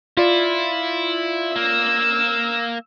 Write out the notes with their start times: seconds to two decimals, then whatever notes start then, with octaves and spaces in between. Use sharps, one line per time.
0.17 E4 F4 D5
1.56 A#3 E6